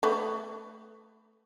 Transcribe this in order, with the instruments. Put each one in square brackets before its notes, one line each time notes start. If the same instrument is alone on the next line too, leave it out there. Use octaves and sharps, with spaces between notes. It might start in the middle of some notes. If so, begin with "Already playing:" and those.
[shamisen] A3 B3